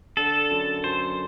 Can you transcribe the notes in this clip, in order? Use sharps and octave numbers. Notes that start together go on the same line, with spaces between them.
D3 A4
F#2
F#2 C5